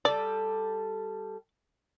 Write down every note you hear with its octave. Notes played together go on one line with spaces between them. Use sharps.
G3 A4 D5